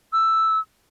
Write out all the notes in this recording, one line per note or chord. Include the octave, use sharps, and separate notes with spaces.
E6